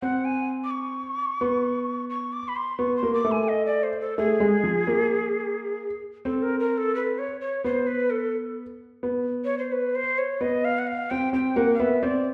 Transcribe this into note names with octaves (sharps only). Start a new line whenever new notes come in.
C4 F#5
G#5
D6
C#6
B3
C#6
D6
B5
C6
B3 C#6
C6
A#3
D6
A3
G#5
D#5
D5
C5
A4
A3 G#4
G#3
F3
A#3
C4 A4
A#4
A#4
A4
B4
C#5
C#5
B3 C5
B4
A4
B3
C#5
C5
B4
C5
C#5
B3 D#5
F5
F#5
F5
C4 G5
C4 G5
A#3 F#5
F5
B3 E5
C4 D5